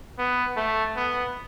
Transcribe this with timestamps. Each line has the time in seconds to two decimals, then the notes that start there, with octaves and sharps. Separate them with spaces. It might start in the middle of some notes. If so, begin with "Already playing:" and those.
0.18 B3
0.57 A3
0.96 B3